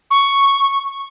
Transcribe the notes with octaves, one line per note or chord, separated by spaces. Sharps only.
C#6